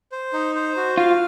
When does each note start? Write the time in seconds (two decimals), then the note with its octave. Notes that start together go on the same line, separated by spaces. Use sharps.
0.12 C5
0.33 D#4
0.55 C5
0.77 F#4
0.97 F4 F5